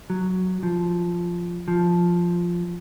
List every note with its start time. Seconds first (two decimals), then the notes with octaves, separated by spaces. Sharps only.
0.10 F#3
0.63 F3
1.68 F3